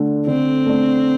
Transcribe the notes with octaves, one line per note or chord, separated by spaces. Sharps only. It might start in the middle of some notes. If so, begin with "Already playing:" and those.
Already playing: D3 A3 D4
D3 C4
A3 D4